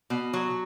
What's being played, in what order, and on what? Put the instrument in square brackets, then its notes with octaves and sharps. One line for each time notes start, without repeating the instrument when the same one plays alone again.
[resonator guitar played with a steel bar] B2
F#3